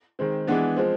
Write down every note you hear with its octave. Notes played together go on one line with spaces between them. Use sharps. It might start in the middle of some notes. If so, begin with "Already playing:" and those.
D#3 G#3 C4
E3 G#3 B3 D4
F3 G#3 C4